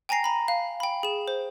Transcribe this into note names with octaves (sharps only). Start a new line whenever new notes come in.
G5 G#5 A#5 A#6 C7
A#5 B5
F5
G5 B5
G#4 E7
C5